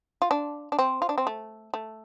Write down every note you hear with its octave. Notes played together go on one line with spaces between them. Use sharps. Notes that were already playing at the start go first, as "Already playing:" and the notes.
F4
D4
D4
C4
F4
D4
C4
A3
A3